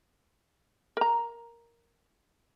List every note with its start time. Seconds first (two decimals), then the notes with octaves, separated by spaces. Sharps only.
0.97 A#4 A#5